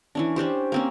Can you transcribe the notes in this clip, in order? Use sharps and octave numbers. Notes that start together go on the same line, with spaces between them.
E3 C#4 D4
C#4 D4 G4 C5
A#3 C4 C#4